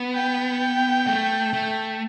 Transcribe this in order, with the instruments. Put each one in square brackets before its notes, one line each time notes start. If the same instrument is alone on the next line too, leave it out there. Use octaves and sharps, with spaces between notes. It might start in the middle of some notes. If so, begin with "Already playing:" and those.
Already playing: [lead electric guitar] B3
[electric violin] G5
[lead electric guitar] A3
A3